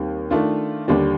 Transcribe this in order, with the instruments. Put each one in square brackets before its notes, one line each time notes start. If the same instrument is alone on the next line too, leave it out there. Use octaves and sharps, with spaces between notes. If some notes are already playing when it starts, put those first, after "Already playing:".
Already playing: [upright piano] D#2 D#3 G3 C4
D#3 A3 D4 F4
D#2 D3 G3 D4